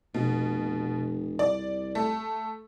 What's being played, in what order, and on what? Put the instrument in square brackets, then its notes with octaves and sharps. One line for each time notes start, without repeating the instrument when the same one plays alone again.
[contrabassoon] F1 [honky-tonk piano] B2
[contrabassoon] C2 [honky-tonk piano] D5
[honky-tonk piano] A3